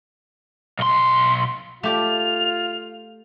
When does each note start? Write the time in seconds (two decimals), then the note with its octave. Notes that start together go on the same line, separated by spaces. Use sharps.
0.79 B1 C6
1.83 A3 F4 G4 D5 F7